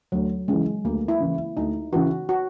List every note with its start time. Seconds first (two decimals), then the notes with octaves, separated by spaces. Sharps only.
0.12 D2 F#3
0.48 C#3 E3 G#3
0.84 D2 A#3
1.08 E4
1.20 C#3 E3
1.57 D2 D#4
1.93 C#3 E3 F#4
2.29 F#4